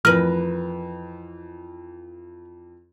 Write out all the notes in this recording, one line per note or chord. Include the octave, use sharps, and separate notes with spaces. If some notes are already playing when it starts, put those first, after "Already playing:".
F2 E3 A#4 B4 F6